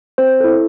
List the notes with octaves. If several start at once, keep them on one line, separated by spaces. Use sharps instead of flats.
C4 C5
E4 A4